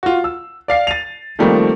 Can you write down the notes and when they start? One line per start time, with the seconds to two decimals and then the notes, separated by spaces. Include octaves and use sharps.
0.03 F4 F#4
0.24 E6
0.68 D5 F5 C7
0.87 A6 D#7 F7
1.39 D#3 F3 G3 A3 A#3 C4